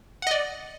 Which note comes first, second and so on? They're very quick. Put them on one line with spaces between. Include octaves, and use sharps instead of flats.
F#5 D#5 D5